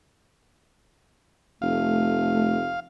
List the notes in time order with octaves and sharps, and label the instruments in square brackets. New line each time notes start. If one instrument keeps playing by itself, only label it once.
[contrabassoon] F1 [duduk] A3 [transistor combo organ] F5